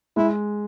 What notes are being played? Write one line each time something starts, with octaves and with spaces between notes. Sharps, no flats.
G#3 E4